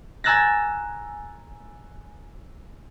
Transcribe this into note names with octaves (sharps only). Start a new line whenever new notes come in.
G#5 A#5 E6 F#6 A6 A#6